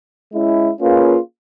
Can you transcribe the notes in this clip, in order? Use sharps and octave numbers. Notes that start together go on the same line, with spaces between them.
G#3 C#4 E4
A#3 C#4 F4 G#4 B4